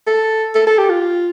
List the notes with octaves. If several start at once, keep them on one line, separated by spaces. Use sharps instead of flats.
A4
A4
A4
G4
F4